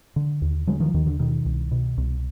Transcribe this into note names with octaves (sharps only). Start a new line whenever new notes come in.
D3
D#2
D3 F#3 G#3
D#3 F3
D#2 D#3
D3
B2 D#3
C2
B2
C2